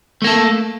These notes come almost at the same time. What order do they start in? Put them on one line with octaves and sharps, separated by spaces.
A3 A#3 A4